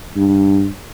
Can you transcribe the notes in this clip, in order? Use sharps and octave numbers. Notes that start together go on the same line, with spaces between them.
G2